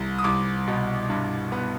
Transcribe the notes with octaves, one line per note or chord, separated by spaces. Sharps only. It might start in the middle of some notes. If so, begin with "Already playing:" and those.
Already playing: C2
D#6
C2 D6
B2
G2
B3